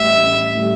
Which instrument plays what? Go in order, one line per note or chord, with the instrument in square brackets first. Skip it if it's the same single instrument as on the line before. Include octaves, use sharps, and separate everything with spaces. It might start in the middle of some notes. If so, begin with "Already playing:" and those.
Already playing: [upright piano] A1 A2 G3 [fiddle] E5
[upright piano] A1
A2 G3